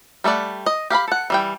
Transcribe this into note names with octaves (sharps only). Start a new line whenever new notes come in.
G3 A3 B3 D5 F#5
D#5
G4 F5 A#5 B5
A4 F#5
E3 G3 G5